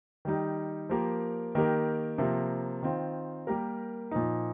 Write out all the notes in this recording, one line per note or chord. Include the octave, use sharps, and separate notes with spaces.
D#3 G3 D#4
F3 A#3 G4 A#4
D#3 A#3 G4 A#4
C3 F3 A#3
D#3 C4 F4
G3 A#3 G4 A#4
A#2 F3 D#4